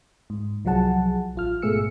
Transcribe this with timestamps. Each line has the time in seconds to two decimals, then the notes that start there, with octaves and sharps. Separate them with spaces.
0.30 G#2
0.65 C2 F3 F#3 G#4 F#5 A5
1.36 A1 F4 F6
1.62 G#2 B2 A3 G#4 E6 C#7